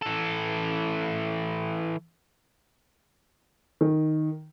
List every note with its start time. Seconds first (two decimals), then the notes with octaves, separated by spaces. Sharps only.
0.02 E3 A4
3.81 D#3